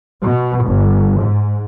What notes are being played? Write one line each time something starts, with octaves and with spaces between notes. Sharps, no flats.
B2
G1
G#2